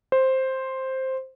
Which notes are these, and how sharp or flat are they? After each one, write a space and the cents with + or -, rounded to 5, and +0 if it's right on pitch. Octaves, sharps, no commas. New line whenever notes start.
C5 +5